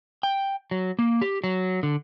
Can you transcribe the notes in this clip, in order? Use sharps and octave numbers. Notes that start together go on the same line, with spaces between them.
G5
F#3
A#3
G4
F#3
D3